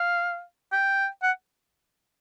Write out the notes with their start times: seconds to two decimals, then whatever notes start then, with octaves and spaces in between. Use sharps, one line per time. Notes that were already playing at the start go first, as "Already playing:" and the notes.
Already playing: F5
0.72 G5
1.23 F#5